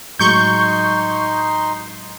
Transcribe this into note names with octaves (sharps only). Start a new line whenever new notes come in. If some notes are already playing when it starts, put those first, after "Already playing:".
A2 F#3 G#3 D#4 C6 C#6 G6